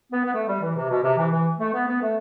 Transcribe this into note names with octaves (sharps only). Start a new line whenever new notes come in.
B3
B3
A3
G3
E3
C3
B2
C3
E3
E3
A3
B3
B3
A3